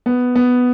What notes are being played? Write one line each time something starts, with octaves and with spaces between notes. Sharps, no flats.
B3
B3